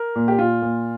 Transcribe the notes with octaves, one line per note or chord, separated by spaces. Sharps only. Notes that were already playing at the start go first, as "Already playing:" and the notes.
Already playing: A#4
A#2
G4
A#2 F4
A#2